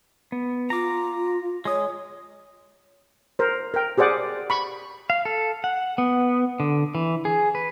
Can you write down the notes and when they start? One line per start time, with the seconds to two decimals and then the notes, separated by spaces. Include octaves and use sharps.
0.32 B3
0.70 F4 A#5 D6
1.65 G#3 C#5 D#6
3.39 A#4 C5
3.74 A#4 G5
3.98 G4 G#4 C5 D5 F#5
4.50 B5 C#6
5.10 F5
5.25 A4
5.64 F#5
5.98 B3
6.60 D3
6.95 E3
7.25 G#4
7.55 B4